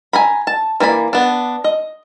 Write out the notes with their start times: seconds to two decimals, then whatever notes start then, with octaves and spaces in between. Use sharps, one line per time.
0.13 G#5 A#5 B5
0.47 A5
0.80 E3 A#3 D5 B5
1.13 B3 D4
1.64 D#5